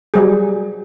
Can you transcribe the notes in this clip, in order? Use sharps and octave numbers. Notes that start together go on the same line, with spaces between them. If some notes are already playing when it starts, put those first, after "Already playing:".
F#3 G3 G#4